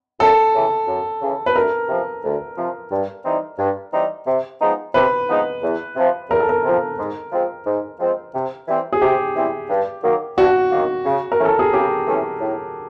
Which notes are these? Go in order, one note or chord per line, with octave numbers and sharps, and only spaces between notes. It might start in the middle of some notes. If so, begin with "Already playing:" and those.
F#2 A4
C#3 E3
F#2
C#3 E3
B4
D2 A#4
C3 F3
D2
C3 F3
G2
E3 G3 C4 D#4
G2
E3 G3 C4 D#4
C3
F3 G#3 B3 D#4
C3 B4
F3 G#3 B3 D#4
E2
C3 F3
E2 A#4
A4
A#4
C3 F3
G#2
F3 G#3 C4
G#2
F3 G#3 C4
C3
E3 G3 C4
G#4
C3 G4
E3 G3 C4
G2
D#3 F#3 A#3
G2 F#4
D#3 F#3 A#3
C#3
A#4
E3 A3 C#4
A4
G#4
C#3 G4
E3 A3 C#4
A2